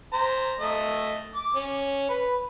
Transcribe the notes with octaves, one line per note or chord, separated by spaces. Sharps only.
C5 A#5
A3 D#5
D6
C#4
B4